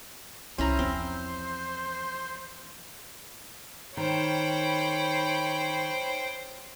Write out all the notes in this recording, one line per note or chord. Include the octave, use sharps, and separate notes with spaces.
C2 F3 C#4 E4 C5 A#5
E2 F3 C4
D#3 C5 C#5 G5 B5